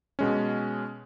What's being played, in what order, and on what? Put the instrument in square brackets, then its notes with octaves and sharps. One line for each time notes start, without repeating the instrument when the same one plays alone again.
[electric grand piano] B2 G#3 C#4